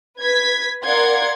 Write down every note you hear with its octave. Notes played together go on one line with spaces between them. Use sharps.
B4 G#6 B6
A#4 D5 F5 F#5 C6 G#6